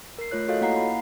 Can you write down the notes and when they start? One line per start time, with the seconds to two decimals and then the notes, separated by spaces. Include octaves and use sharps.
0.18 A#4 C7
0.31 A3 F4 C#5 F#6
0.48 F4 F#4 A4 C#5 D#5 F5
0.61 A#3 E4 F5 F#5 A#5 C7
0.76 B5